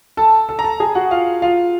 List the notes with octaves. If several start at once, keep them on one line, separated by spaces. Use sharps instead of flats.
A4 A5
A4 A5
A#5
A4 A5
G#4 G#5
F#4 F#5
F4 F5
F4 F5